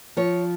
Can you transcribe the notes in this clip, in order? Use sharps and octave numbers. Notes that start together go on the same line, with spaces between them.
F3 C#5